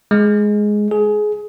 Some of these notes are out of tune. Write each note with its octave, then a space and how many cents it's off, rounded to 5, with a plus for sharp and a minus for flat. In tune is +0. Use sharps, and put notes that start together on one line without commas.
G#3 +5
G#4 +20